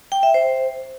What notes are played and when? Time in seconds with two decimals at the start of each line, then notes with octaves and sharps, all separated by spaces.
0.12 G5
0.23 E5
0.34 C5